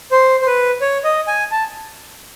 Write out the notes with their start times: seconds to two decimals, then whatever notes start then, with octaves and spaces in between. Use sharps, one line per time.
0.11 C5
0.41 C5
0.47 B4
0.81 C#5
1.04 D#5
1.28 G#5
1.51 A5